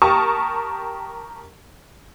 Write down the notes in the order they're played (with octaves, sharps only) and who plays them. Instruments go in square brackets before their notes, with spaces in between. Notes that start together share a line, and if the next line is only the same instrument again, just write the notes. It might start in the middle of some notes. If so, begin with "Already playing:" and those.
[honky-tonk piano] G4 A#4 A5 C#6 D#6